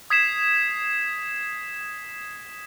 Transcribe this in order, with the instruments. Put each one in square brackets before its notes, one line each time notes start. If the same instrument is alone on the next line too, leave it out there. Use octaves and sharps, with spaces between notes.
[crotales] D#6 G#6 B6 C7 E7